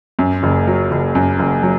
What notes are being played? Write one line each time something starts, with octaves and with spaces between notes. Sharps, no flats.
F#2
F#1
F#3
F#1
F#2
F#1
F#3